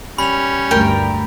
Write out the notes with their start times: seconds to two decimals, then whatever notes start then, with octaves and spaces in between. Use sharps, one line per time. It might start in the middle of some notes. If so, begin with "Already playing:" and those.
0.18 G3 C#4 B5 F7
0.71 D2 G2 A3 A#4 G5